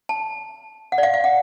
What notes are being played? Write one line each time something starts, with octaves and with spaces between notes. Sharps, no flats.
A5
F#5
D5
F5
F5
F#5